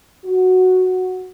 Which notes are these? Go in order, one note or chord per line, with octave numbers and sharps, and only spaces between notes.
F#4